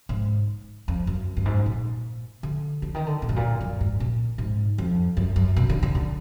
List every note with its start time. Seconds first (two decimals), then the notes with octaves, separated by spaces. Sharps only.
0.09 G#2
0.88 F2
1.07 F#2
1.37 F#2
1.45 G#2
1.66 A#2
2.43 D3
2.82 D3
2.94 D#3
3.06 D3
3.22 A#2
3.29 G#2
3.36 A#2
3.60 F#2
3.81 G#2
4.00 A#2
4.38 G#2
4.78 F2
5.17 F#2
5.36 F#2
5.56 B2
5.70 D3
5.83 D3
5.95 D3